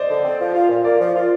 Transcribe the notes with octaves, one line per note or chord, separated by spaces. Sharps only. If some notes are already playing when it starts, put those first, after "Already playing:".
Already playing: C5 D5 D#5
D3
C4
F3
F4
A#2
A#3 D5
F3
F4